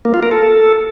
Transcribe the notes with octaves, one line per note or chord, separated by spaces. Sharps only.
A#3
F4
A#4
A4